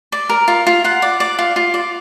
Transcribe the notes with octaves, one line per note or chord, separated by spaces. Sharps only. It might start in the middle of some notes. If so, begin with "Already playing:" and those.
D5
A#4
F4
F4
F4 F#5
D5
D5
F4
F4
D5